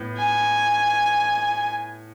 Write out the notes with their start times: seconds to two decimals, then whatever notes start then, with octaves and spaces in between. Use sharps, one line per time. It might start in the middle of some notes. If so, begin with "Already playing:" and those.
Already playing: A2 B3
0.17 G#5